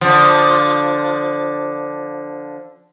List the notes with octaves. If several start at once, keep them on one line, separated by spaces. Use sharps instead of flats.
D3 F3